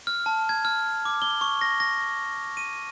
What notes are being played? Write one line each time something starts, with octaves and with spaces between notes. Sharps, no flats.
F6
A5
G#6
F6
D6
G7
C#6
A#6
A#6
D#7